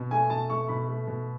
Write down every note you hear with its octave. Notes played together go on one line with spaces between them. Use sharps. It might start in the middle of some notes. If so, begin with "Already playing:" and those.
Already playing: B2
A3 G#5
B2 A5
A3 C#6
B2 B5
A3
B2